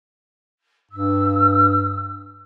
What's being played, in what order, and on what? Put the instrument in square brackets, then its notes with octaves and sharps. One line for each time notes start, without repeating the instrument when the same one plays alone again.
[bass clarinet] G2 [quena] E6